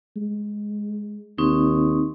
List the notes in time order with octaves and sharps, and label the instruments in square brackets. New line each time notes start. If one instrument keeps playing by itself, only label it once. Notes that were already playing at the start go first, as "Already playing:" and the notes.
[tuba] G#3
[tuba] D#2 [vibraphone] C4 D#4 C#6